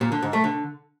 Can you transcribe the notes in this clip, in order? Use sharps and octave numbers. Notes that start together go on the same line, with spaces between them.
A#2
D3
G#2
A3
D3